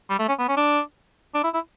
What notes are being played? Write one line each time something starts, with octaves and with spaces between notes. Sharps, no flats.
G3
A3
C#4
B3
C#4
D4
D4
E4
E4